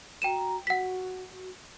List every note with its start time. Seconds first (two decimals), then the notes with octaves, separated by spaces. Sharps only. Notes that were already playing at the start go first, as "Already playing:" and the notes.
0.22 F#4 G5 A#5 D#7 E7
0.67 F#4 F#5 B6